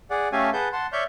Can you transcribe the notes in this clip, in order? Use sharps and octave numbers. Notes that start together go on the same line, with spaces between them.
G#4 D5 F#5
A3 C#4 G4 A4 F5 G#5
G#4 B4 F#5 A5 G6
F#5 A5 C6
C#5 D5 E5 C#6 F6 G6